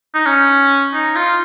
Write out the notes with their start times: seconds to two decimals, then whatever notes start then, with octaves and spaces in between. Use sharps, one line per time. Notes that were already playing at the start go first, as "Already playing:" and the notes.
0.15 D#4
0.26 C#4
0.93 D#4
1.16 F4